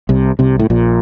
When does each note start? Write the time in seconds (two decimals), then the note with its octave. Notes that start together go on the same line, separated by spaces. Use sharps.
0.09 C2 C3
0.39 C2 C3
0.59 A2
0.70 A#1 A#2